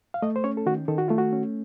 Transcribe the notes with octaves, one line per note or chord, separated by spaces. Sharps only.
F5
A3 D#5
C5
C#4 C#5
A4
D#3 F#4
D#3 A4
F#4
A3 F4
F#4
C#4